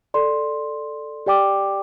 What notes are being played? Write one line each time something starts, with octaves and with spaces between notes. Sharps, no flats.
A4 D5 C6
G4 D5 G5 D6